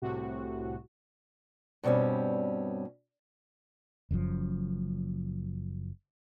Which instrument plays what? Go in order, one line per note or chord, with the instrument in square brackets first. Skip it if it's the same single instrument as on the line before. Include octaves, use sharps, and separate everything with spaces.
[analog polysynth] C2 A2 C3 F#4
[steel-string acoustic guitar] G2 B2 G3 C4 C#4
[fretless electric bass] F#1 F#2 C3 F3